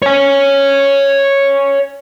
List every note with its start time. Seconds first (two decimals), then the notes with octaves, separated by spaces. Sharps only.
0.02 C#5 G#5